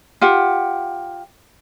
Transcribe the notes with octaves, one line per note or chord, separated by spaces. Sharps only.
F4 G4 F#5